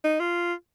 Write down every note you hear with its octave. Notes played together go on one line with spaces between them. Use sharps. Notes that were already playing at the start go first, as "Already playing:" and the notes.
D#4
F4